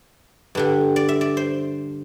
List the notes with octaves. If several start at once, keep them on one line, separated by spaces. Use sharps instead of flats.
G2 D3 G3
D5
E5
D5
C5